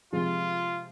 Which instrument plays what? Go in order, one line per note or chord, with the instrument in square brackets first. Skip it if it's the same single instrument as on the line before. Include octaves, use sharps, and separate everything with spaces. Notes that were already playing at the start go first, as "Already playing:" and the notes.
[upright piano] C3 F3 G#3 [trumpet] F4